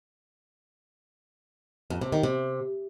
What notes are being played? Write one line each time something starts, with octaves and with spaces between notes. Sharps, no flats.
F2
C3
D#3
C3